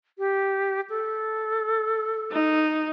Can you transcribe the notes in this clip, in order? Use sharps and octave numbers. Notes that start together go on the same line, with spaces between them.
G4
A4
D#4